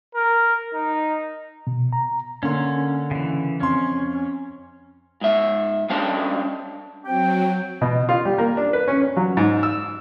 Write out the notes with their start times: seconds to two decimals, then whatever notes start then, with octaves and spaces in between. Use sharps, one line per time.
0.15 A#4
0.74 D#4
1.67 B2
1.93 A#5
2.43 D3 A#3 C#4 C6
3.11 C#3 E3
3.60 F2 C#4 C6
5.21 G#2 E5
5.90 G3 C#4 D4 C5 F5 A5
7.05 F#3 C4 G5
7.81 B2
8.09 F4
8.25 G3
8.38 A#3
8.57 D4
8.73 B4
8.88 C#4
9.02 C#4
9.17 F#3
9.37 G#2
9.63 E6